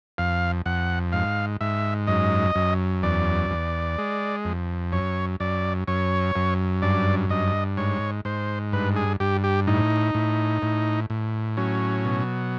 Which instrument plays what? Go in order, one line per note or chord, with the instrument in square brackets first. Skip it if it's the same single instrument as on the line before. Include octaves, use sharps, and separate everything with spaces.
[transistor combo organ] F2 F5
F2 F#5
G#2 F5
G#2 E5
F#2 D#5
F#2
E2 D5
E2
G#3
F2
F#2 C#5
F#2 D5
F#2 C#5
F#2
G2 D5
G2 D#5
G#2 C#5
G#2 C5
G2 B4
G#4
G2 G4
G4
A2 D#4
A2
A2
A2
F#3 C#4
B2